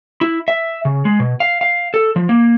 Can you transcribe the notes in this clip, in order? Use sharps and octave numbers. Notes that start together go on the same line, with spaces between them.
E4
E5
C#3
G#3
B2
F5
F5
A4
F3
A#3